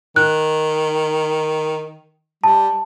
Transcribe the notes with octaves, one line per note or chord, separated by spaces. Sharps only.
D#3 F#6
G3 A5